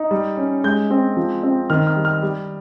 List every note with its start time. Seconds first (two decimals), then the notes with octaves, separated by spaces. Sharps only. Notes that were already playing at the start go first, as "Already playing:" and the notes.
Already playing: D#4
0.11 G3
0.37 C#4
0.64 G#3 G6
0.91 C4
1.17 F3
1.43 C4
1.70 D#3 F6
1.87 F6
1.96 G3
2.05 F6
2.22 G3